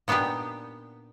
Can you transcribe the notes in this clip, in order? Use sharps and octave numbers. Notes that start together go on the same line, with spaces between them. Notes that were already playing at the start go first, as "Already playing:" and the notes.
A#2 B3 D4 D#4 G4